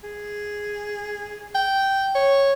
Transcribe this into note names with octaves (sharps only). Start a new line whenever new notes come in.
G#4
G5
C#5